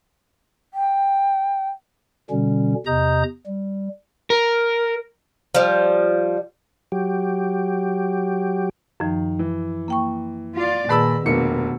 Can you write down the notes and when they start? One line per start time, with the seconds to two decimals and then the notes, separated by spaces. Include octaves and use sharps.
0.74 G5
2.30 B2 D3 G3 C#4
2.86 E2 C3 D#5 A#5 D#6 G6
3.47 G3
4.30 A#4
5.55 F3 G3
6.92 F#3 G4
9.00 F#2 D#3 F3
9.39 E3
9.88 A#3 G5 C#6
10.55 F4 D5
10.89 A#2 D#3 G#4 B4 A5 B5 E6
11.26 F1 B2 A#3 D4 C#7